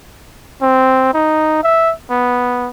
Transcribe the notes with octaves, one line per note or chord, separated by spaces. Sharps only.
C4
D#4
E5
B3